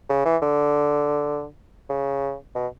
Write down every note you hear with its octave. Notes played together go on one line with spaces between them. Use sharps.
C#3
E3
D3
C#3
B2